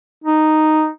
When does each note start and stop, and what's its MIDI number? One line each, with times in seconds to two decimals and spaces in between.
0.25 0.89 63